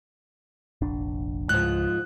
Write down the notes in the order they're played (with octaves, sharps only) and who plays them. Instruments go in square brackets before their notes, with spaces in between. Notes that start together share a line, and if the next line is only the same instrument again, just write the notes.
[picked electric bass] F1 A#1 D4
[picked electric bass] C#2 [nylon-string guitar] G#2 F3 [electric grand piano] F#6